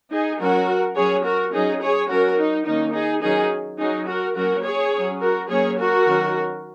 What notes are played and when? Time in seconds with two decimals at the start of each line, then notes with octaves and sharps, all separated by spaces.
0.11 D#4 G#4
0.39 F#3 C#4 F#4 A#4
0.96 F#3 C#4 G#4 C#5
1.24 F#4 A#4
1.52 F#3 C#4 D#4 G#4
1.81 G#4 C#5
2.09 F#3 C#4 F#4 A#4
2.37 D#4
2.66 D#3 A#3 C#4 D#4
2.94 D#4 G#4
3.22 D#3 F#3 C#4 D#4 G#4
3.79 F#3 C#4 D#4 G#4
4.07 F#4 A#4
4.36 F#3 A#3 C#4 F#4 A#4
4.64 G#4 C#5
4.93 F#3 C#4
5.21 F#4 A#4
5.49 F#3 A#3 C#4 G#4 C#5
5.77 F#4 A#4
6.06 D#3 F#3 C#4